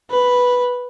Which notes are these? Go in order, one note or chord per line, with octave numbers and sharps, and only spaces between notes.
B4